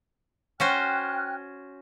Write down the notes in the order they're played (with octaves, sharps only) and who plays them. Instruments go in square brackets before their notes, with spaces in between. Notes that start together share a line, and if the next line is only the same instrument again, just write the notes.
[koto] C#4 F#4 C5 [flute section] G5 F6 F#6